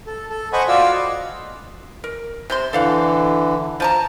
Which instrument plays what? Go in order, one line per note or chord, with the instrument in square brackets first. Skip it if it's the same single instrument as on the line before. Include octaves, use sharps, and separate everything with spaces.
[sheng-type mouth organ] A4
A4
C5 D#5 F#5 G#5 B5 C#6
F4 F#4 D5 F5 E6
D#5
[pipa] A#4
C3 C5 C6
[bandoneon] D3 E3 [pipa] A4 F5 F#5
[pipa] F3 A5 A#5